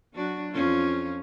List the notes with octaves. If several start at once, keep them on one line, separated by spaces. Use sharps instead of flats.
F#3 D4 F#4
F2 C#4 F4